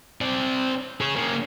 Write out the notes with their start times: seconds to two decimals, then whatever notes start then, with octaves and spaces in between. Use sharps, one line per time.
0.21 C4 D5
1.01 G#4 C#5
1.16 A#3 C#4